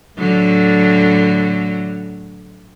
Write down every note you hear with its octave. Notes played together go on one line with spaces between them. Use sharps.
A2 D3 F#3